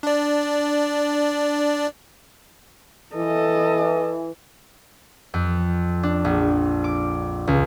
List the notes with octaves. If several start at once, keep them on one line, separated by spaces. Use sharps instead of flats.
D4 D5
E3 A4 D#5
F2
D4
A#1
D6
C#2